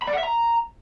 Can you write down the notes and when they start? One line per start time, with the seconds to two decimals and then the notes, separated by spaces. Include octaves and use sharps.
0.02 B5
0.07 D5
0.13 F#5
0.18 E5
0.23 A#5